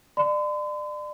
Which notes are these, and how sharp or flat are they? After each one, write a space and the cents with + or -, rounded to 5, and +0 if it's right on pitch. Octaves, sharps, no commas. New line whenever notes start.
D5 +30 C6 -45